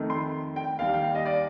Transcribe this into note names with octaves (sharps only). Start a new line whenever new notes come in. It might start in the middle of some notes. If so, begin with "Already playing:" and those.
Already playing: F2 D#3 A3
C6
G5
D#2 D#3 G3 F5
G5
F5
D#5
D5